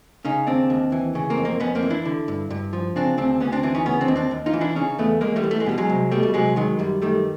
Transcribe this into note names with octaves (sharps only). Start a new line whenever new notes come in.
C#3 C#4 D#4
D#2 C4 D4
D#2
E3
C#3
A#3 C4
F2
A#3 C4
F2 B3 C#4
A#3 C4
E3
D4 E4
D3
G2
G2
F3
C#3 C4 D4
D2 C4 D4
D2 B3 C#4
C4 D4
E3 C4 D4
C#4 D#4
C#3 B3 C#4
C4 D4
D#2
C4 D4
D#2
D#4 F4
E3
D4 E4
C#3 C#4 D#4
E2 A3 B3
E2 G#3 A#3
G3 A3
E3
A3
G#3
B2 G3
F#3 G#3
C2
B2 G3 A3
G3
C2 F#3 G#3
D#3 F#3 G#3
F#2 G3
D#3 G3 A3